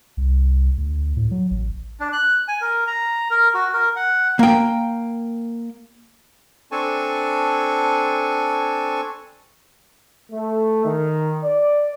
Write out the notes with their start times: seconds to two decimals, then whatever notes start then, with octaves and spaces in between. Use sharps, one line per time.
0.17 C2
0.78 D2
1.17 A2
1.31 F#3
1.51 A1
2.00 D4
2.13 F#6
2.48 G#5
2.61 A#4
2.87 A#5
3.30 A#4
3.54 F#4
3.73 A#4
3.96 F#5
4.39 A#3 G5
6.72 C4 D4 A4 G#5 A5 C#6
10.32 A3
10.85 D#3
11.44 D5